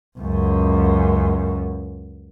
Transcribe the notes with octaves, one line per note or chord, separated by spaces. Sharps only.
C#2 F#2